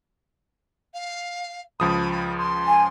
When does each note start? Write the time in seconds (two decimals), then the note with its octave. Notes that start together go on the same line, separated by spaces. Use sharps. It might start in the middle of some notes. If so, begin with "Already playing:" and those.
0.94 F5
1.80 C#2 F3 B5 D#6
2.38 C6
2.67 G#5